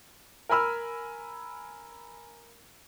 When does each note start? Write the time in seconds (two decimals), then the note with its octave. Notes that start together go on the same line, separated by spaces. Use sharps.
0.49 A#4 G#5 B5 E6 F6